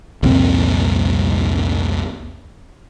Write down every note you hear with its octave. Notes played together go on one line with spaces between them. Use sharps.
C2 F2 A#2 C4